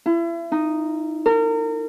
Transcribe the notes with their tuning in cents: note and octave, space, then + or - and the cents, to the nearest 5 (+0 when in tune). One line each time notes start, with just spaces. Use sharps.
E4 +35
D#4 -5
A#4 -35